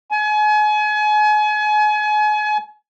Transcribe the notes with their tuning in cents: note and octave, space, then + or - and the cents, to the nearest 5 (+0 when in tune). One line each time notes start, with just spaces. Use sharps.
G#5 +35